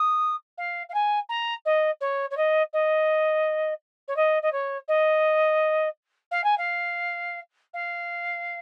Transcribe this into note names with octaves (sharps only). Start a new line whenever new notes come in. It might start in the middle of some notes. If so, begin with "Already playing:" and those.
Already playing: D#6
F5
F5
G#5
A#5
D#5
C#5
C#5
D#5
D#5
C#5
D#5
D#5
C#5
D#5
F5
G#5
F5
F5